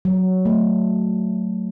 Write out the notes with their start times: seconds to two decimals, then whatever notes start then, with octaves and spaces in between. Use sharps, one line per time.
0.05 F#3
0.45 A3